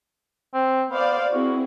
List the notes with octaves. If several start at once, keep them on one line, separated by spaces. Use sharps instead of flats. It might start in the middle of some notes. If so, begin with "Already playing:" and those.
C4
B3 C5 D5 F5
C4 E4 F#4 G#4